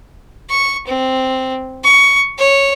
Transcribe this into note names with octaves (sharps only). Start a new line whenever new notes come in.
C#6
C4
C#6
C#5